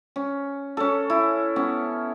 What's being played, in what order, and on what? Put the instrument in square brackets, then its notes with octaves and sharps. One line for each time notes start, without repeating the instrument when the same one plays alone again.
[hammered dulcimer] C#4
C#4 A4
E4
B3 C#4